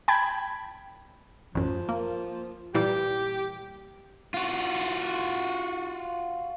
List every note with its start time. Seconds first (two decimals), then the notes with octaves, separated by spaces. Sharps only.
0.08 G5 A5 B5 G#6
1.55 A1 F#2 F3
1.89 A#3
2.74 A#2 E3 G3 G4
4.34 F4 F#4